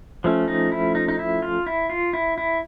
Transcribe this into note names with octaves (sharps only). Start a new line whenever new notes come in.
F3 A3 C#4
D#4
E4
D#4
D#4
E4
F4
E4
F4
E4
E4